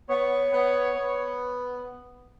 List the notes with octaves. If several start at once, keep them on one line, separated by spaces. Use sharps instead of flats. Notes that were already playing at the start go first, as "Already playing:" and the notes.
B3 C#5
B3
B3